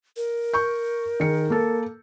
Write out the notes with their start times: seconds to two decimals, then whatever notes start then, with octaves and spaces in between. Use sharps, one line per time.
0.17 A#4
0.54 C#6 G6
1.20 D#3 G#4 C#7
1.50 A#3 A4